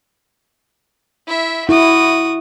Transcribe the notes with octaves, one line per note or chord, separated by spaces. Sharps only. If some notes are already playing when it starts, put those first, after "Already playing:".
E4 E5
E4 F#4 D#6